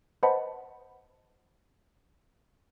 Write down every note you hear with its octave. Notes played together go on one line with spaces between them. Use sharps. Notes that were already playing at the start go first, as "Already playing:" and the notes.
B4 C5 D#5 F#5 A5 B5